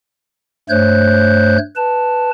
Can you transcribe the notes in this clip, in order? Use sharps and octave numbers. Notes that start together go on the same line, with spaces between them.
G2 A3 C5 C#5 F#6 G6
B4 A5